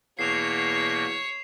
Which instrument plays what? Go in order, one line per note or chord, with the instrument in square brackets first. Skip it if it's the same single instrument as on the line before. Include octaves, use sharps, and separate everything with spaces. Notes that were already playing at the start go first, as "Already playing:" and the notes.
[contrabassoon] E2 [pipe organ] B2 A#3 [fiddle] C#5 [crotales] C7 E7 F7